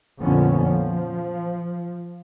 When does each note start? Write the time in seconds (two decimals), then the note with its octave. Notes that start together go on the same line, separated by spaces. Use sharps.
0.21 F2 A#2 D3 F3 B3 C#4
0.64 F3